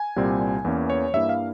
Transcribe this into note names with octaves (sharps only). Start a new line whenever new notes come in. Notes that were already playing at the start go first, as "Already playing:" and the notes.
Already playing: G#5
C2 A#2 G3 C4
E2 E3 A#3 C#4
C#5
G2 G3 A#3 E4 E5
F5